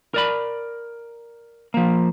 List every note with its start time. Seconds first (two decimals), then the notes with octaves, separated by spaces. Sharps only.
0.14 A#4 D5 B5
1.74 F3 A#3